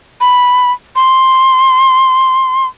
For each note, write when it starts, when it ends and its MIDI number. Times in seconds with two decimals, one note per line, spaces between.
0.21 0.72 83
0.96 2.66 84